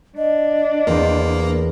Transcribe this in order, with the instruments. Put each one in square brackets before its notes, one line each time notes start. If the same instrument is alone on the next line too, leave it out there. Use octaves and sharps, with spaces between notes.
[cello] D4 [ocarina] D#5
[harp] E2 C4 [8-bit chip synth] A#3